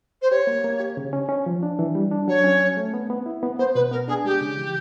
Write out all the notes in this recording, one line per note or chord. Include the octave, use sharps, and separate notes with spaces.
C5
G4 C#5
A#3
A#3
G4
C#3
C#4
C#4
F3
D4
E3
G3
D4
F#3 C#5
C#4
C#4
A3
B3
B3
E4
B3
B3 C5
B2 B4
B3 A#4
D4 G#4
G#3 G4
C#3
E3